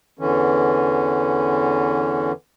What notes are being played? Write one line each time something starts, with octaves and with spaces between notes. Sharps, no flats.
E2 D3 E3 C#4